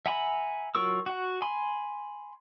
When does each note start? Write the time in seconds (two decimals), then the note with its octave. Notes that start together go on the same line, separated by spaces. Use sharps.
0.06 E5 F#5 G#5 A#5 B5
0.75 F#3 F4 A#4 C#6 E6
1.06 F#4 F#5
1.42 G#5 B5 C6